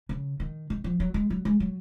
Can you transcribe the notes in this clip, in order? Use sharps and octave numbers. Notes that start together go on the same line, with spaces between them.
C#3
D#3
D#3
F3
F#3
G#3
F#3
G#3
F#3